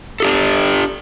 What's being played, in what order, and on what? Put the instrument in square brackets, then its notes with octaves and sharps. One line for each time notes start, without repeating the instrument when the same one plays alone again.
[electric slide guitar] D4 G4 A4